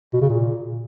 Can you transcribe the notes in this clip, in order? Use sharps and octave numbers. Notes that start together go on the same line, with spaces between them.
B2
C#3
A#2